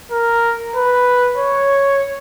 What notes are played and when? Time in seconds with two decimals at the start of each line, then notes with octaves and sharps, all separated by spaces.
0.12 A#4
0.76 B4
1.37 C#5